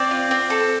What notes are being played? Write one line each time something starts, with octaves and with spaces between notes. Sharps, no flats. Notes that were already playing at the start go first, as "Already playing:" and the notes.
Already playing: C4 D5
F4
C4
A4